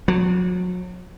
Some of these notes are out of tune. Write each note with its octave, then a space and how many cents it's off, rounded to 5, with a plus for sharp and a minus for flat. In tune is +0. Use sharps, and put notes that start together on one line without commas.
F#3 -35